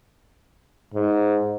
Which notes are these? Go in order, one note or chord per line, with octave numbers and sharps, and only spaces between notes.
G#2